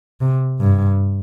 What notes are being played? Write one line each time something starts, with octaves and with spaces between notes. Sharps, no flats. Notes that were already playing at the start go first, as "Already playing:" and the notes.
C3
G2